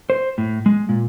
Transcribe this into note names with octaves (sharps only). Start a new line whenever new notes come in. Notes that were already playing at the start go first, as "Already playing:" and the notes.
C5
A2
G#3
A#2